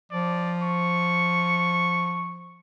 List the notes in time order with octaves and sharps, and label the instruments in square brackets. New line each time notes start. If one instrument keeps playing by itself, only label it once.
[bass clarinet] F3 [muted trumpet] D5
[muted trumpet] C#6